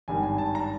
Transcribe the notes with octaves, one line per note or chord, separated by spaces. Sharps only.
G#1 G2 D#3 G#5
G#5
A5
A#5